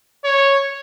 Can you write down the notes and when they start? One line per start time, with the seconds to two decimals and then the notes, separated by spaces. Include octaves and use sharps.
0.24 C#5